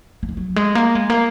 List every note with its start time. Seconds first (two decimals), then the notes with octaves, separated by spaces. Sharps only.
0.23 A#3
0.29 G#3
0.37 F#3
0.56 G#3
0.75 A#3
0.95 G#3
1.10 A#3